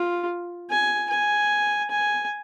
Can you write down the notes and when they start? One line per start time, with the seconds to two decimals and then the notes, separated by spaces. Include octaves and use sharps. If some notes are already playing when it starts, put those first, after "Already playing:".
Already playing: F4
0.70 G#5
1.10 G#5
1.91 G#5